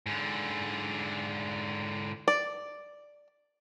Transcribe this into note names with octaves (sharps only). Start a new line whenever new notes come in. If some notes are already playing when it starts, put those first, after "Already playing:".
G#2 D3
D5